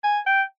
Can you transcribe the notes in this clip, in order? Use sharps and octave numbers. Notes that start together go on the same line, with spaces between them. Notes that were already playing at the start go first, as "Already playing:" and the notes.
G#5
G5